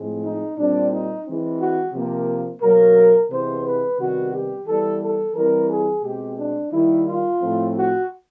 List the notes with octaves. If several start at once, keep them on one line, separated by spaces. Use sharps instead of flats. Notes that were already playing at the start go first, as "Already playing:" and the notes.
Already playing: A2 F3 G#3 C4
D#4
A#2 G3 C4 D4
D#4
E3 G#3 C4
F#4
C3 F3 A#3
B2 F#3 A#3 A#4
C3 E3 G#3 B3 C5
B4
C3 D#3 G3 B3 F#4
G4
E3 G3 B3 A4
A4
E3 G3 C4 A#4
G#4
B2 G#3 C4 G4
D4
D#3 G3 A#3 E4
F4
A2 F3 A3 C4
F#4